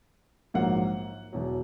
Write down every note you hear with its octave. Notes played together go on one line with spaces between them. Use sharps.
A#1 G#2 F#3 A#3 F#5
E1 E2 B2 F#3